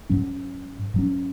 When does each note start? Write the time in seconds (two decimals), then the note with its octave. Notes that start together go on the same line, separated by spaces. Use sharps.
0.09 G#2 F#3 C#4
0.94 G#2 F#3 C#4